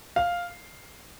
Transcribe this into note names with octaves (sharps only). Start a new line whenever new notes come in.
F5